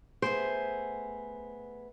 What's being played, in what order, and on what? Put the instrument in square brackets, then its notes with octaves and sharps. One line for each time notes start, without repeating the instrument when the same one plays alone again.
[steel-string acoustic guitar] A3 B3 G#4 [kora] C5